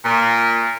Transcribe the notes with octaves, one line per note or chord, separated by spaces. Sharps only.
A#2